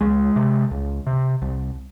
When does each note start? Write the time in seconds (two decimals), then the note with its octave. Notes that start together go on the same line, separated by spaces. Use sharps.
0.01 C#2 G#3
0.36 C3
0.71 C#2
1.07 C3
1.42 C2